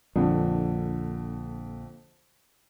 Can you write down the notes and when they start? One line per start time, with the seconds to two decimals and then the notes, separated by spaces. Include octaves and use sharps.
0.16 A#1 F2 D3